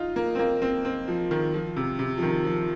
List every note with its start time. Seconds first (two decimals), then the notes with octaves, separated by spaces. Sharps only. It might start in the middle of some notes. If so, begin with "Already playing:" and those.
Already playing: D#4 F4
0.16 A#3
0.35 C4
0.39 A#3
0.62 C4
0.85 C4
1.08 F3
1.31 D#3
1.54 F3
1.76 C3
1.99 C3
2.17 F3
2.23 D#3
2.45 F3